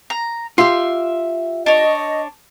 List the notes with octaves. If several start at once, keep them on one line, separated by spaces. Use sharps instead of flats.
A#5
F4 G4 E5 C6
D4 C#5 D#5